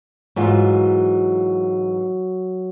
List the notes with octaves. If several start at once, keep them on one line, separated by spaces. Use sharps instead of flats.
G#2 E3 F#3 F4